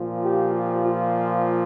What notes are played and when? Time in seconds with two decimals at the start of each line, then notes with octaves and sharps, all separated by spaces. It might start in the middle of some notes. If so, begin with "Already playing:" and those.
Already playing: A#2 F3
0.24 G4
0.54 F4
0.85 F4